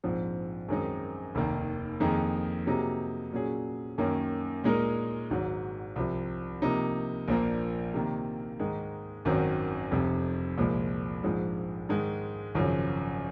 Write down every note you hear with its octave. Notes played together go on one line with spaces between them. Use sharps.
A#1 G#2 F3 C4
F#2 D#3 G#3 C4 D#4
F1 D#2 D#3 A#3
F2 D#3 A#3 D#4 G#4
C3 F#3 A#3 D#4 G#4
A#2 F#3 C#4 G#4
F#2 D#3 A#3 C#4
A#2 G#3 D#4 A#4
G#1 G#2 F#3
C2 C3 F3
C3 F3 A#3 D#4
A#1 A#2 F3 A#3
C3 D#3 A#3
G#2 D#3 G#3 D#4
G#1 F#2 D#3 F#3 C4
F1 F2 C3
C2 A#2 F3 G#3
A#1 G#2 F3 G#3
G#2 D#3 G#3
G#1 F#2 C#3 F3